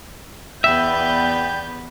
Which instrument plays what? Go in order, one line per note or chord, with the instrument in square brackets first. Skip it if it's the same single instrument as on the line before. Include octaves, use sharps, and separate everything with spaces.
[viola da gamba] E2 B3 B4 [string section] D5 G6 [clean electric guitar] E5 [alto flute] G5